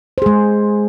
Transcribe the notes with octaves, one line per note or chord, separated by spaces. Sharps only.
G#3 G#4 C5